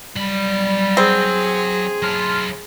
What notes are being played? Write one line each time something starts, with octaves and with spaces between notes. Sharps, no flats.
F#3 G3 B5
C4 G#4
F#3 E4 A5 C6 F6